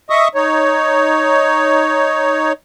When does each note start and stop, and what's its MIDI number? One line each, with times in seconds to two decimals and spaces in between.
0.10 0.28 75
0.10 0.28 76
0.10 0.28 85
0.10 0.28 87
0.35 2.53 63
0.35 2.53 73